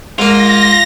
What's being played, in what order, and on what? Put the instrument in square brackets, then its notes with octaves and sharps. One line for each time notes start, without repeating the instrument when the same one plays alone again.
[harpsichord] G#2 A#3 [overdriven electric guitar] F4 [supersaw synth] A#6